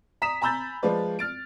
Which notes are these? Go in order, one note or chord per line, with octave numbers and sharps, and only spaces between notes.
A#5 D#6 B6 E7
G#5 A#5 B5 E6 G6 A6
F3 G#3 F4 B4 D5
F6 A6 D7